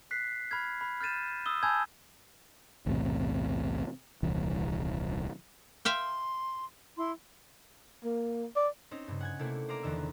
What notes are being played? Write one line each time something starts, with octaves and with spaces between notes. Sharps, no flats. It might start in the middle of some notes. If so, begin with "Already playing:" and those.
F#6 B6 C7
B5 F6 G#6
B5
F6 G6 A6 D#7 E7
D#6 E6 G7
G#5 A5 B5 E6 G6 G#6
B1 E2 A2 C3
D#1 C2 E3
E5 F5 G5 C6
E4 C6
A#3
D5
C4 C#4 D#4
G2 C#3
F#5 G#5 G#6
C3 A3 A#3 E4
C5 D5 F5 A#5 D6
E2 D3 D#3 E5